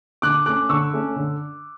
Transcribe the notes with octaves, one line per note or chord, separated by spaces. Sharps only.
D3 D6 F#6
A3 C#4 D6 F#6
D3 C#6 E6
A3 C#4
D3